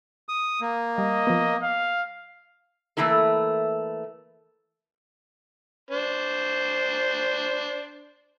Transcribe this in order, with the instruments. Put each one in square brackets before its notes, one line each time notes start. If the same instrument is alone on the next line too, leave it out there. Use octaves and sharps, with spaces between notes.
[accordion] D#6
A#3
[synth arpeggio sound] G3 [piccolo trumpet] D#5
[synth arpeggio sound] F3 B3
[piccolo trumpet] F5
[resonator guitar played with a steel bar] E3 A3 A#3 E4 A4
[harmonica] D4 C5